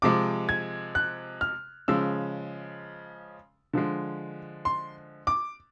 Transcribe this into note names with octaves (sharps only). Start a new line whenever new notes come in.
C3 F3 G#3 D6
G#6
F#6
F6
C#3 F3 G#3 E6
D3 F3 G#3
C6
D6